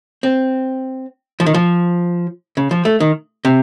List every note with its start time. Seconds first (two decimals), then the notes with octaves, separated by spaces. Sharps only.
0.23 C4
1.40 F3
1.46 D#3
1.54 F3
2.57 C#3
2.71 F3
2.85 A3
3.00 D#3
3.45 C3